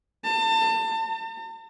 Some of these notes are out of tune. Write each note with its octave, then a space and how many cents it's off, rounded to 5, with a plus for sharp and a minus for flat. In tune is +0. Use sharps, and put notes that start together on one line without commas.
A5 +30
A5 +45